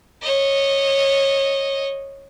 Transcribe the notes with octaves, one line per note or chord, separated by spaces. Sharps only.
C#5 D#5